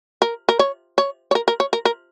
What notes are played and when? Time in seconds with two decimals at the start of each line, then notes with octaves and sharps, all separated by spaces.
0.22 A#4
0.49 A#4
0.59 C#5
0.98 C#5
1.31 C#5
1.35 A#4
1.48 A#4
1.60 C#5
1.73 A#4
1.85 A#4